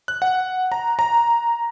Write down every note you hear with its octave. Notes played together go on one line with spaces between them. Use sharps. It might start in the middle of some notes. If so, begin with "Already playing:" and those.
F#6
F#5
A#5
A#5